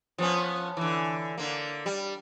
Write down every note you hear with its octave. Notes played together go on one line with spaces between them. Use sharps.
F3 B3 C#4
D3 E3
D3 A#3
G3